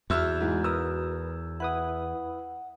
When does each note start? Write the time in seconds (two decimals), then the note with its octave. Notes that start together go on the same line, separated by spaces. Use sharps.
0.10 E2 F#4 E5 E6 F6
0.41 G#2 E3
0.64 A#4 B4 D#6 E6
1.60 E4 B4 F#5 D#6